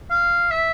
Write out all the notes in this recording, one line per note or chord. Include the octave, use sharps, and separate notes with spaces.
F5
E5